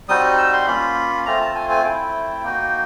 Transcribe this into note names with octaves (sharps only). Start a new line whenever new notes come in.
G3 C4 D#4 F#4 D#6
E6
C6
A#3 C#4 F4 B5
A3 C4 F4 A#5
A5
G#5
G#5
A3 C4 E4 G5
A#3 D#4 F#4